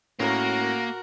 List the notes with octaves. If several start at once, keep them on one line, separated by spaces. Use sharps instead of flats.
A2 A#3 C#4 F#4 A#4